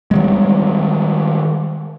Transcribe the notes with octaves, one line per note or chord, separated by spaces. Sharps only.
D#3 G3 G#3